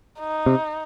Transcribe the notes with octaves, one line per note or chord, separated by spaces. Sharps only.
D#4
C3